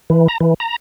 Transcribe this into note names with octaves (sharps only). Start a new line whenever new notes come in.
E3
A#5
E3
A#5